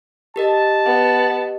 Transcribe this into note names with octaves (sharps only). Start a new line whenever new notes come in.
G4 A#4 D#5 A5
B3